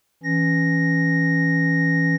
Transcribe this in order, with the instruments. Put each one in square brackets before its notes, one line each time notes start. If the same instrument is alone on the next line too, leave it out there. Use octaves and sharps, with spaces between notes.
[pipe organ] E3 C#4 A#6